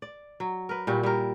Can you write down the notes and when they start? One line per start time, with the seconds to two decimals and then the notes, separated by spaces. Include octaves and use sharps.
0.02 D5
0.40 F#3
0.69 A#4 B4
0.87 A#2 G3 E4 F#4
1.03 G3 A#4